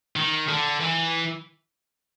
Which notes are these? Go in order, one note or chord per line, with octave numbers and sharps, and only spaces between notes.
D#3
D3
E3